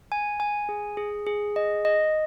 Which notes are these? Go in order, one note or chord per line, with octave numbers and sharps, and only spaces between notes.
G#5
G#5
G#4
G#4
G#4
D#5
D#5